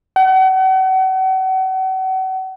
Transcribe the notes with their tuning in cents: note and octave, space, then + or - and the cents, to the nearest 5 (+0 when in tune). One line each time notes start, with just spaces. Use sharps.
F#5 +40